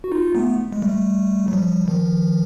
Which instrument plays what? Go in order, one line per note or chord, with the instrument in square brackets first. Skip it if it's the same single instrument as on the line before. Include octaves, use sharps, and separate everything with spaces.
[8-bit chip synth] F#4
D#4 F4
A3 B3
G#3
G3 A3
F#3
F3 G3
D#3 F3